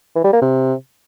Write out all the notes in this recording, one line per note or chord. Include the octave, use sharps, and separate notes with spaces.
E3
G3
A#3
C3